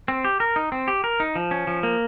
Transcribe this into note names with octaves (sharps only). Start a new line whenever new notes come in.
C4
G4
A#4
D#4
C4
G4
A#4
D#4
F3
C#4
F3
A#3